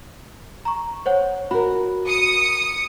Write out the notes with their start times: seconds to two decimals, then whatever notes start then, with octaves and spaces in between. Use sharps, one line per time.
0.65 A#5 C#6
1.06 C5 C#5 F#5
1.51 F#4 A#4 B5
2.07 D#6 C#7